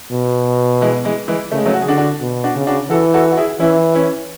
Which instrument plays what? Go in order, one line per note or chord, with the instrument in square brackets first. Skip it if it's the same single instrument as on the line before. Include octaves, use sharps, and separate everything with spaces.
[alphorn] B2
[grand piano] E3 G#3
E3 G#3
E3 G#3
[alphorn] C#3 [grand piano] A3
[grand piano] G#3
F#3 A3
F#4
G#4
[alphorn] D3 [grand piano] D4 F#4
[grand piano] D4 F#4
[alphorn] B2
[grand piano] D4 F#4
[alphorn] C#3
[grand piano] D4 F#4
[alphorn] E3 [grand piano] F#4 A4
[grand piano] F#4 A4
F#4
E4 G#4
[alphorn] E3 [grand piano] C#4 E4
[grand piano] C#4 E4